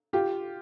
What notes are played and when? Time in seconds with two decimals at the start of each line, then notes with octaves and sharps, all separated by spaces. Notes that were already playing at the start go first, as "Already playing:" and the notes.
0.13 F4 G4